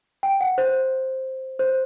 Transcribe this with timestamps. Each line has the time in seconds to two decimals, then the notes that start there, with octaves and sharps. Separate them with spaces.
0.23 G5
0.41 F#5
0.58 C5
1.59 C5